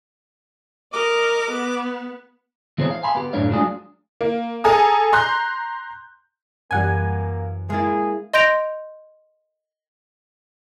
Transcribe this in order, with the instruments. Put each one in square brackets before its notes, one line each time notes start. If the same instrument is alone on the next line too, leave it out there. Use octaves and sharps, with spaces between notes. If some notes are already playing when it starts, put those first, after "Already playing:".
[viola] A#4 D#5 [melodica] D6
[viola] B3
[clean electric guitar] E3 B3 G#4 A4 C5 C#5
F5
G#5 B5 C6
B3 G4
F#2 A2 D4 C#5 F5
F#3 G#3 A3 D4 F4 G#4
[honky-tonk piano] A#3
G#4 A4 G#5 A#5 D#6
A#5 C6 F#6 G6
[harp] F#2 E3 [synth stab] G3 F#5 G#5 [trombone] A#3
[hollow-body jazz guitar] G#3 A#3 E4 [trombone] G#4 [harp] F5 A6
[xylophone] D#5 C6 G6 A#6 D7 F7